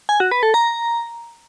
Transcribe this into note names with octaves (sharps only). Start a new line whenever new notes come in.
G#5
F#4
B4
A4
A#5